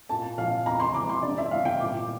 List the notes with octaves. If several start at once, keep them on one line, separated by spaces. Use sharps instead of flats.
A#2 A5
A#1 F5
E2 A#5
C6
E1 D6
C6
G2 D5
E5
G1 F5
G5
A#2 D6